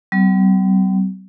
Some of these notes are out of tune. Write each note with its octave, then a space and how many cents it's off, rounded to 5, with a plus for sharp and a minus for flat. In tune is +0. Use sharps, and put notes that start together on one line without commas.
G3 -45 C4 -45